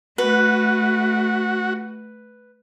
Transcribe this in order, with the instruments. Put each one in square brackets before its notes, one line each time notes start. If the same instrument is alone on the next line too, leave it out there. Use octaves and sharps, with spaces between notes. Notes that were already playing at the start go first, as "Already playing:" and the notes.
[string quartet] A3 [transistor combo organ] F#4 [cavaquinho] B4